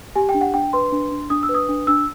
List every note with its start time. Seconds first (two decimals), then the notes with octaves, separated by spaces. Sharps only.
0.16 G4 G#5
0.29 G5
0.34 D4
0.41 F#5
0.54 D4 G5
0.73 B4 C6
0.92 D4
1.11 D4
1.30 D4 D#6
1.43 E6
1.49 B4
1.54 D#6
1.69 D4
1.87 D4 E6